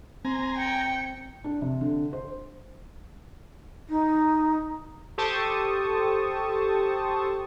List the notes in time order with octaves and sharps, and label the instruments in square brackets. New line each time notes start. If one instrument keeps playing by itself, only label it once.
[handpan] C4 [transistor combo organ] G#5 A#5 [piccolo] C6
[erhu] G5 [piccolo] C#7
[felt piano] D4
C3
D3
C5
[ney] D#4
[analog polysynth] G4 A4 C5 A5 C#6 D#6